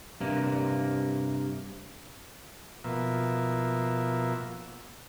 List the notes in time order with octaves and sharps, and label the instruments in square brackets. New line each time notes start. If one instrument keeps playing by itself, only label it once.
[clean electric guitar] G2 C3 A#3
[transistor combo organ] B2 F3 A#3 E5